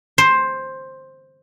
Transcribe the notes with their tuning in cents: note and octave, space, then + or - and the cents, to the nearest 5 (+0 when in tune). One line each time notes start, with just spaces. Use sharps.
C5 +10